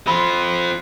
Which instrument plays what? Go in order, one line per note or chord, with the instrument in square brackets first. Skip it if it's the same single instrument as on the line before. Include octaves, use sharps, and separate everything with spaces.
[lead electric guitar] C4 F4 [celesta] B5 C6